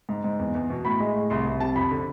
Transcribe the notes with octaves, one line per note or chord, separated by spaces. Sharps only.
G#2
G#2
E2
E2
B2
A2 B5
G#3
A2
C2 C6
C2
C3 A5
F2 B5
D3